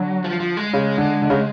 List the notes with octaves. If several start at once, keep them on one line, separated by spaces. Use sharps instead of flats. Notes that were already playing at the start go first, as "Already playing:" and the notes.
Already playing: D3 F#3
F3
F3
G#3
C#3
D3
D3
C#3